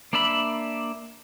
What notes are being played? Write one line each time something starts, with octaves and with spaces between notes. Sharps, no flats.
A#3 D4 D5 E5 B5